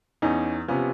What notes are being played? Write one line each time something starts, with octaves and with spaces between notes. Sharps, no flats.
E2 C#4 D#4
C3 F3 B3 C#4